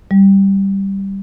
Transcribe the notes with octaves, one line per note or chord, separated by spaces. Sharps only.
G3